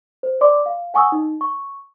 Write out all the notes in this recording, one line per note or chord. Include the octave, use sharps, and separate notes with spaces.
C5
D5 C6 D6
F5
F#5 G#5 C#6 D#6 E6
D#4
C#6